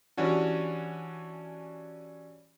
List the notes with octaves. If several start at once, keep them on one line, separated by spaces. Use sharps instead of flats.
E3 G3 C#4 D4 F#4